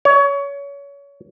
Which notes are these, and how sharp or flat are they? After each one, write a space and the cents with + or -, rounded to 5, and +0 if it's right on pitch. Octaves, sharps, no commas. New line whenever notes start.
C#5 +25